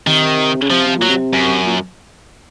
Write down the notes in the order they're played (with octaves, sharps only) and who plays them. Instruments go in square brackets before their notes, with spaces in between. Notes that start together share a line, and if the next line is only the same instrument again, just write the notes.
[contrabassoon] C3 [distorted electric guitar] D#3
[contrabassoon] C#3
[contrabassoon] C3 [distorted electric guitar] F3
[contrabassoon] C3
[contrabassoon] A#2 [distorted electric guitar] F#3
[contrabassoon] C3
[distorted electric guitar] F#2
[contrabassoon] A#2